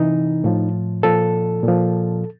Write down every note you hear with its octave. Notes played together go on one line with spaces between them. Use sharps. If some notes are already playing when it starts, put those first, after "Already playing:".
Already playing: C3 E3 D#4
A2 F3
A#2 F3 A4
A#2 F3